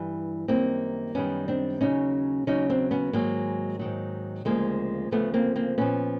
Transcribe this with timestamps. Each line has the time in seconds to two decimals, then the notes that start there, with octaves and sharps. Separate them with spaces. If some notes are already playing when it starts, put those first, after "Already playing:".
Already playing: G2 E3 G3
0.48 F#2 D#3 G3 A#3 C4
1.15 F#2 D#3 G3 B3 C#4
1.48 C4 D4
1.81 D#2 C#3 F#3 C#4 D#4
2.47 D#2 C#3 F#3 C#4 D#4
2.70 C4 D4
2.91 B3 C#4
3.13 G#2 D#3 F#3 G#3 A#3
3.79 G#2 D#3 F#3
4.45 D2 C#3 F3 G#3 A#3
5.11 D2 C#3 F3 A3 B3
5.34 A#3 C4
5.56 A#3 C4
5.78 A#2 F3 B3 C#4